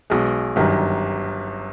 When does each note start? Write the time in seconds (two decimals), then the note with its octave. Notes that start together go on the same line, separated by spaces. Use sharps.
0.10 B1 B2 G#3
0.56 G1 F#2 D#3 G3